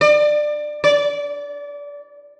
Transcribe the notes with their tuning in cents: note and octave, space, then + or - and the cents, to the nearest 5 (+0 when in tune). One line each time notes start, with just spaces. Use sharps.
D5 +20
D5 -25